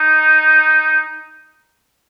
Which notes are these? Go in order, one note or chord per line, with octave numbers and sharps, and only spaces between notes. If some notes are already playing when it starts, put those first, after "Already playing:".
Already playing: D#4